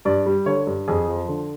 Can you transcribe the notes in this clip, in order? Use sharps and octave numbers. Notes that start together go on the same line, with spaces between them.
G2 D5
G3
D3 C#5
G2
F2 G#4
F3
D3